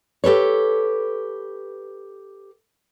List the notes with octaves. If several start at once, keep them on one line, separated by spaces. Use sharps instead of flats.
G4 A4 B4 C#5